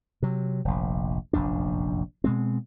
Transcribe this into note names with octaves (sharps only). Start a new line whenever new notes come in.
C3 F#3
F1 A#1
F1 A#1 F#2 D4
B2 G#3 C4